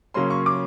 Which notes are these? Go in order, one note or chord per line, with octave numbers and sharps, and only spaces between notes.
C#3 F#3 A#3 C#4 C6
C#6
D6